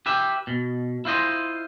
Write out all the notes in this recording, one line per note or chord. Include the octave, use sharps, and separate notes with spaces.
G4 B4 E5
B2
E4 F4 C5 D#5